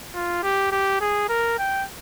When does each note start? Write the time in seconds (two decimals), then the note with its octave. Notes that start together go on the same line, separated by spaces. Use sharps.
0.15 F4
0.43 G4
0.72 G4
1.01 G#4
1.29 A#4
1.59 G5